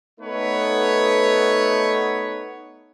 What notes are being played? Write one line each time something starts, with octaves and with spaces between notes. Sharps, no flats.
A3 B3 D#4 A4 B4 C#5